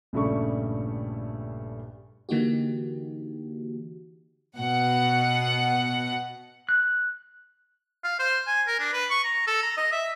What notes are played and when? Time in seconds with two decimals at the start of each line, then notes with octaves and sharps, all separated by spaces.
0.13 A#1 G2 C#3 G3 A3 C#6
2.29 D3 E3 A#3 D#4 F#4 G4
4.57 B2 F#5
6.69 F#6
8.04 F5
8.19 C5
8.47 G#5
8.67 A#4
8.80 D4
8.93 B4
9.10 C#6
9.24 A#5
9.47 A4
9.63 A#5
9.77 D#5
9.92 E5